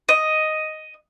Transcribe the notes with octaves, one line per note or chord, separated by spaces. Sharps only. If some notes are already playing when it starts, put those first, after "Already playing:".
D#5